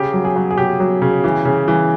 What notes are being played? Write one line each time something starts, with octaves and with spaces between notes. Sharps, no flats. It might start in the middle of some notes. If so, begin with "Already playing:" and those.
Already playing: C#3 G4
F#3
G#4
F#3
G#4
C#3 G4
F#3
C#3
E3
C#3
E3